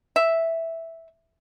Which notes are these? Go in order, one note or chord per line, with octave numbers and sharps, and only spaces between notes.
E5